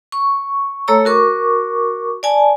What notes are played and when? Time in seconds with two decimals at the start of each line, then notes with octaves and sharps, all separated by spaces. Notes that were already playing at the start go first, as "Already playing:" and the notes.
0.12 C#6
0.88 A3 A4 C#5 A#5 E6
1.05 F#4 A#4 C#6 D6
2.23 D5 G#5 A5